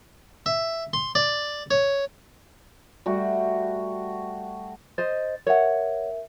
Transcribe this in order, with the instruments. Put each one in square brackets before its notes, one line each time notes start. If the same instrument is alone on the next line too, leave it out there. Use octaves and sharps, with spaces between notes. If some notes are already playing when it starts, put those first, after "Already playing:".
[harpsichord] E5
C6
D5
C#5
[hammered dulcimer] G3 A3 F#4
[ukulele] C5 D#5 [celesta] A6
[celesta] A#4 E5 [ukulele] C#5 F#5